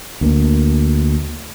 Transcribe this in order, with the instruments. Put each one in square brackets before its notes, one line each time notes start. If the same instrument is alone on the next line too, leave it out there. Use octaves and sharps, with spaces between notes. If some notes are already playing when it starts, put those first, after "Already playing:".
[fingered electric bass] D2 A#3